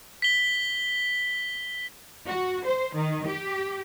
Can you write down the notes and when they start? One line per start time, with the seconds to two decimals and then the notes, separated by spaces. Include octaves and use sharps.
0.22 B6 G7
2.26 F#4
2.64 C5
2.94 D#3
3.26 G4